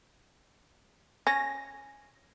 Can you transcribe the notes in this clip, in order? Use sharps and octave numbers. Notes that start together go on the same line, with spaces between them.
C#4 A#6